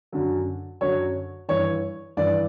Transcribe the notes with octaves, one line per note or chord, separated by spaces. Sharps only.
F#2 D3 F#3
F#2 D3 F#3 C#5
G2 E3 C#5
G2 E3 D5